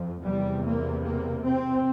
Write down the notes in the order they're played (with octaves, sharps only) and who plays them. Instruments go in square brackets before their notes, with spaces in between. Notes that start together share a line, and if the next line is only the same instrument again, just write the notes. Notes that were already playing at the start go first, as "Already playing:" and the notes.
Already playing: [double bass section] F2 F3
E2 C3 G3
A#3
A#3
C4